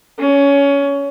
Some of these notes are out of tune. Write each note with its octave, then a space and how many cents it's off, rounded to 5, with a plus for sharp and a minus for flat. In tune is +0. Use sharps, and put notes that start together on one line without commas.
C#4 +20